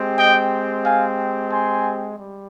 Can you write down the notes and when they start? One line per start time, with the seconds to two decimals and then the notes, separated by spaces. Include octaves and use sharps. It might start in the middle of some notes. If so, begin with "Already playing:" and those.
Already playing: G#3 C4 G4
0.17 D#5 G5
0.84 F5 G#5
1.51 G#5 C6
2.18 G3